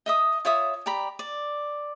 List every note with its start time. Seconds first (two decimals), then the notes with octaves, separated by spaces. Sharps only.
0.06 D#5 E5 D#6
0.45 F4 C#5 E5 D#6
0.86 G4 D5 A#5 B5
1.19 D5